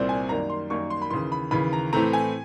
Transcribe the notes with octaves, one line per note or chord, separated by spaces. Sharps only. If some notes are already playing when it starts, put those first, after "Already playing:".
Already playing: C2 A#2 G3 C4
G#5
F#2 D#3 G3 A#3 A#5
C6
F#2 D#3 G3 A#3 C#6
C6
B5
D#2 C#3 E3 C6
B5
D#2 C#3 E3 B5
A#5
A2 E3 A3 C4 A#5
G#5